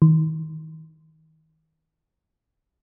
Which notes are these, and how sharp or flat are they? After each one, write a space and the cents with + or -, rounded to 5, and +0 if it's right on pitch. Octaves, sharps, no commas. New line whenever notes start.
D#3 +25